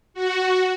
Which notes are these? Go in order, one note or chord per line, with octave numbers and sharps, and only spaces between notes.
F#4